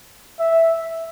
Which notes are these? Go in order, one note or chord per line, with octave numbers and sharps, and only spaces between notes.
E5